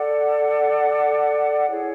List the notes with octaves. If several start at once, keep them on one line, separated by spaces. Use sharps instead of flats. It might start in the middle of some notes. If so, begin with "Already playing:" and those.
Already playing: A4 D5 F#5
E4 G#4 C#5